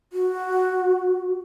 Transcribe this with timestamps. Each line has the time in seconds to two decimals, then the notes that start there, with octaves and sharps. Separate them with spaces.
0.13 F#4